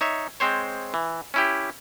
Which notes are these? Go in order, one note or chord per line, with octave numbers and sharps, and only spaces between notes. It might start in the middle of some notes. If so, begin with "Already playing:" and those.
D#4 C#5 E5
G#3 C4 C5 C#5
E3
C#4 E4 G4